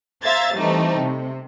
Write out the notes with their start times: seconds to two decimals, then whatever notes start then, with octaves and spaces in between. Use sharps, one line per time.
0.23 C5 E5 F5 A#5 G#6 A6
0.55 E3 G3 A3 C4 D#4
0.98 C3